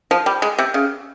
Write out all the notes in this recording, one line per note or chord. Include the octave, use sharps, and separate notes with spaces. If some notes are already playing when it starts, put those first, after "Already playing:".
F3
G3
G#3
C3
C#3